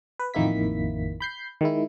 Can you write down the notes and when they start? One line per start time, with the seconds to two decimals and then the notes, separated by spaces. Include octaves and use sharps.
0.20 B4
0.34 A1 F2 D#3 A#3 E4 B6
1.21 B5 G6 C7
1.61 D#3 G#3 E4